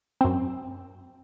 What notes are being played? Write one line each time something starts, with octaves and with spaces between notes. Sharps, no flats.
F#2 C4